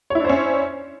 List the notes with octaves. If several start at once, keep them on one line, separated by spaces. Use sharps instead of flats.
C#4 D4 E4 C5 C#5